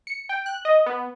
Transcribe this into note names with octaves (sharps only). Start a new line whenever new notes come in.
C#7
G5
F#6
D#5
B3